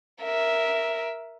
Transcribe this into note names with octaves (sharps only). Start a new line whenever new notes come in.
A#4 E5